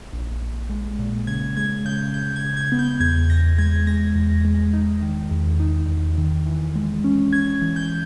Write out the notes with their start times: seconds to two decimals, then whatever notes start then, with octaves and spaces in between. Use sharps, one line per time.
0.13 A#1
0.41 A#1
0.70 G#3
0.99 A#2
1.27 C#3 G#6
1.57 G#3 G#6
1.85 C#3 G6
2.14 C#3 G6
2.36 G#6
2.43 C#3
2.57 G#6
2.72 B3
2.79 G6
3.00 E2 G#6
3.29 E2 A#6
3.58 G#3 G#6
3.87 G#3 A#6
4.16 E2
4.45 G#3
4.73 D#4
5.02 D#3
5.31 E2
5.60 D#4
5.89 E2
6.18 D#3
6.46 E3
6.76 G#3
7.04 C#4
7.33 C#4 G#6
7.62 E3
7.76 G6